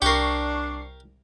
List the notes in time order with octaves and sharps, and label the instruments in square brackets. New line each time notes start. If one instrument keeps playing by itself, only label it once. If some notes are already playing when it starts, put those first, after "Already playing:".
[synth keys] C2 [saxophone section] D4 [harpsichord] G4 A#4 [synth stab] C#6 C7